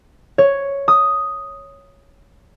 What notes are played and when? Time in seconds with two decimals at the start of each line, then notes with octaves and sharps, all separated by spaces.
0.38 C#5
0.88 D#6